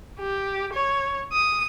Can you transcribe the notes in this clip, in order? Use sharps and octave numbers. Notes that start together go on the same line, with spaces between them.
G4
C#5
D#6